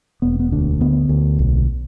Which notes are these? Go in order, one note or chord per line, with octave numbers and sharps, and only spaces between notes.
E1 B3
B3
D2 D4
D3 B3
D2
B1